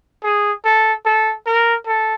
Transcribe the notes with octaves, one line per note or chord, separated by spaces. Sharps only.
G#4
A4
A4
A#4
A4